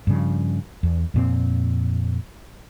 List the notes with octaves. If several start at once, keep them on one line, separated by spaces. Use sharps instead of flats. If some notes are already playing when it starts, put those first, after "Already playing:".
G2 C#3 F3
E2
F2 A#2 C4